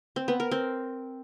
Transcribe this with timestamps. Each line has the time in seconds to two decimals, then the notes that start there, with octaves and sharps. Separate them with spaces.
0.16 C4
0.28 B3
0.40 A#4
0.51 C4